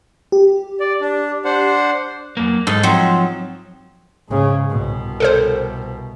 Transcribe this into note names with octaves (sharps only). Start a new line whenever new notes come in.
G4
D5
D4
D4 C5 F#5
F#2 A#3
G#2 D#4 A4
F3 F#3 C4
G#2 C#3
C2 B2
A4 A#4 C5